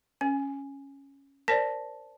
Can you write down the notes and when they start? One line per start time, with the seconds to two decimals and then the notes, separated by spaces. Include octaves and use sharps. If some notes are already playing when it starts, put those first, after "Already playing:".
0.21 C#4 G#5
1.48 A#4 C5 D5 A5 A#6 B6